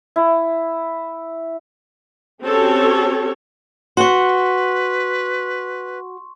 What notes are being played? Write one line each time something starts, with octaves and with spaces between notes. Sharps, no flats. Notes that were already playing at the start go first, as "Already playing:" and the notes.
E4
C4 C#4 F#4 G4 A4 C#5
F#4 B4 F#5 C6 C#6